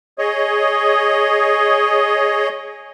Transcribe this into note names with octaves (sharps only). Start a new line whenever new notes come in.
G#4 C#5 D#5